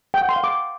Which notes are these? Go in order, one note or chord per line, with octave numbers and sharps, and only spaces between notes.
G5
F#5
C6
F5
D6